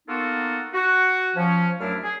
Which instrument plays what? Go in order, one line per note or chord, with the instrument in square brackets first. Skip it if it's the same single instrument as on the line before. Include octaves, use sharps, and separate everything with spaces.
[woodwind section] A#3 B3 D#4 F4 F#4 A4
F#4
F3 C#4
F#2 F#3 A3 D4 E4 F6
G#4